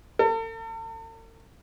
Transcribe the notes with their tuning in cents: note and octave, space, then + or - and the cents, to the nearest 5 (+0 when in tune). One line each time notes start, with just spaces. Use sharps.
A4 +45